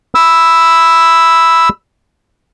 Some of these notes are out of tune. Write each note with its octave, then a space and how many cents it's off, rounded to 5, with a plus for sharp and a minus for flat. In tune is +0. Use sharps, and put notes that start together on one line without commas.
B5 +0 E6 +0